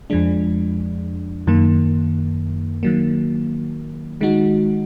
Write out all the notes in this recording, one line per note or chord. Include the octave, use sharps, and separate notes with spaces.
F2 F3 G#3 D4
F#2 D#3 A#3
D#3 F#3 A#3
D#3 G#3 D#4 F#4